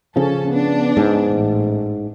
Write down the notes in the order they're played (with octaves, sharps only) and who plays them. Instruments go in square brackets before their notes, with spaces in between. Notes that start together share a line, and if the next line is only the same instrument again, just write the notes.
[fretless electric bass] C#3 F3 [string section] C#4 A4
[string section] B3 D4
[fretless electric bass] G#2
[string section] A1